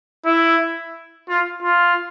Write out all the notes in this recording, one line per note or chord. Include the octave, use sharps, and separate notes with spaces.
E4
F4
F4